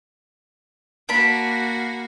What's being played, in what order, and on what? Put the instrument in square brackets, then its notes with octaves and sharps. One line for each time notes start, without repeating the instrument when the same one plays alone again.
[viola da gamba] A#3 F#4 [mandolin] D5 A5 B5